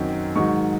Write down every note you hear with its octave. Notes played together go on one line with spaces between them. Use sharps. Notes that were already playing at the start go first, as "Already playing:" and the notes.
Already playing: F#2 D#3 F#3 C4
G#2 D#3 F#3 C#6